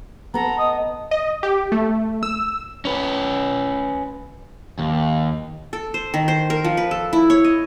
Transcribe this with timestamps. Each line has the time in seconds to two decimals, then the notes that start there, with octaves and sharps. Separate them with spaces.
0.34 B3 A4 A#5
0.58 D#5 D#6
1.11 D#5
1.43 G4
1.72 A3
2.23 E6
2.85 C#4 B4
4.79 D#2
5.73 A4
5.94 C5
6.14 D#3
6.28 C5
6.50 A#4
6.64 F3
6.77 B4
6.91 A4
7.13 E4
7.30 C#5
7.45 D#5